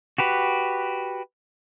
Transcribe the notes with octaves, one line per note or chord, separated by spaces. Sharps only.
F#4 G4 B4